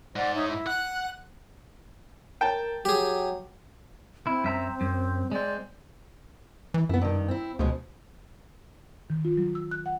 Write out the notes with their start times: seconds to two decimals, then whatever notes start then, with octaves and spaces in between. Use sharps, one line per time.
0.16 G#2 C5 D5 F#5
0.34 D#4 C#5 E5
0.48 E4
0.67 F#5 F#6
2.41 A#4 G5 A5
2.85 F#3 G4 G#4
4.27 C4 E4
4.44 F#2 E5 A#5
4.81 F#2
5.32 G#3 C4 D5
6.74 E3
6.89 F#2 B3 E4
7.02 G2 D#3
7.28 C4 E4
7.59 D2 B2 F3 G#3
9.10 D#3
9.25 F4
9.38 F#3
9.55 E6
9.71 F#6
9.86 F#5